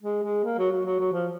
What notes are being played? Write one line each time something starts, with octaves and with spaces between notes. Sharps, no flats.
G#3
G#3
A#3
F#3
F#3
F#3
F#3
F3